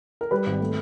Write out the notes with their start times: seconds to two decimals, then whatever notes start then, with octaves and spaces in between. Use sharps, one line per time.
0.21 A#4
0.31 G3 B4
0.46 G#1
0.60 A3